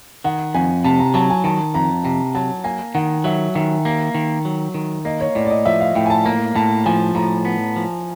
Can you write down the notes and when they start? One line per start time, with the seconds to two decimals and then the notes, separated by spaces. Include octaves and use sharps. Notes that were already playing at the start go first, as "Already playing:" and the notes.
0.24 D#3 F#5
0.54 F2 G#5
0.84 C3 A5
0.99 A#5
1.14 F#3 A5
1.30 G#5
1.44 D#3 A5
1.74 F2 A#5
2.04 C3 A#5
2.35 F#3 A5
2.64 A#3 G#5
2.95 D#3 F#5
3.24 F#3 E5
3.55 D#3 E5
3.85 A#3
4.15 D#3
4.45 F#3
4.74 D#3
5.05 A#3 D#5
5.21 C#5
5.35 A2 D5
5.45 D5
5.50 D#5
5.65 F3 E5
5.81 F5
5.95 A2 G5
6.06 G#5
6.10 A5
6.25 A#3 A#5
6.55 A2 A5
6.86 F3 G#5
7.15 A2 A#5
7.45 B3
7.76 F3